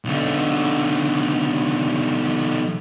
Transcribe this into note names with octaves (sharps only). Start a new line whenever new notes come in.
B1 D3